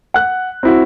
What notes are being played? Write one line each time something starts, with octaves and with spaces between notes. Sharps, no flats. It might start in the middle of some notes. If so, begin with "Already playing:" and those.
F#5 F#6
C4 E4 F#4